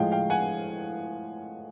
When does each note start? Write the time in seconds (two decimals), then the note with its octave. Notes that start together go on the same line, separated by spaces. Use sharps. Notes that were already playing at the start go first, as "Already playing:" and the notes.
Already playing: A2 F3 G#3 F5 G5
0.12 F5 G5
0.30 F#5 G#5